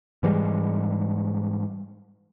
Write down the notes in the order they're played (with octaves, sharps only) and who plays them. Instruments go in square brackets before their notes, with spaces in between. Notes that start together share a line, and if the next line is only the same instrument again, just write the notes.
[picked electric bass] G#2 E3 G3 G#3